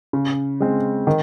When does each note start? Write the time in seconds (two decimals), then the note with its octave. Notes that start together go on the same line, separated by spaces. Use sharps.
0.13 C#3
0.60 G#3 C4
1.07 D#3